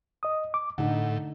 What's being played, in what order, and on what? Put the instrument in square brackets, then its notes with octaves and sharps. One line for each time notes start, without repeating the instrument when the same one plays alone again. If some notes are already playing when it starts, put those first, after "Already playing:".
[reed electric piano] D#5 D#6
D6
[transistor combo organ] A2 [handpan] D3 D#4 [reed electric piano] F#5